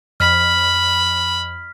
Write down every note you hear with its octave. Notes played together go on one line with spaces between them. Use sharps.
F2 B5 F6 B6